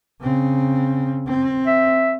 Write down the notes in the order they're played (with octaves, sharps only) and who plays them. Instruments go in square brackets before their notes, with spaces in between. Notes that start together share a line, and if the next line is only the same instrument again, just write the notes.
[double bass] C#3 C4
C4
[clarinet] E5